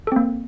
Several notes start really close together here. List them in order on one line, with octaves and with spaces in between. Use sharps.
A4 C4 A#3